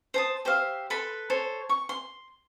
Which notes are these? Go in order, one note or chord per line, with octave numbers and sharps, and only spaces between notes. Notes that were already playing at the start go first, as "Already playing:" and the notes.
C5 A5 D#6
G4 C5 E5 F5
A4 B4 B5 C6
A4 C5 C#5
C#6
C6